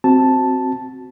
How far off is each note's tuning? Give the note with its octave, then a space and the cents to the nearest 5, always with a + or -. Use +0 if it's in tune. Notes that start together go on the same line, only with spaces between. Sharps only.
C4 +0 F#4 +0 A5 +0